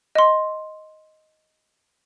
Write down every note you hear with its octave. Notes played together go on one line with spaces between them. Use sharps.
D#5 C6